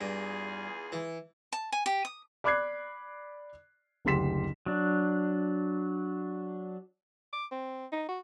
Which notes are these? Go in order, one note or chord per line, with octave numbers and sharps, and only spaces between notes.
E2 G2 F4 G#4
E3
A5
G#5
G4
D#6
D5 B5 D6 F#6 G#6 C7
F#1 D2 G4 C6 B6 E7
F#3 D4
D6
C4
D#4
F#4